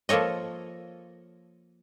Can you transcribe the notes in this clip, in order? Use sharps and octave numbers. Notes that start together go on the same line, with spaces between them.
F3 A#3 A4 C#5 D#5